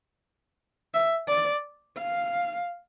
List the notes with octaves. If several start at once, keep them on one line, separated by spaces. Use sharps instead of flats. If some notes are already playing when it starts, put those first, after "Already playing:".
E5
D5
F5